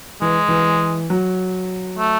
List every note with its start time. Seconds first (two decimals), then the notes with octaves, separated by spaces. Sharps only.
0.21 E3 G#3
0.48 E3
1.10 F#3
1.98 A3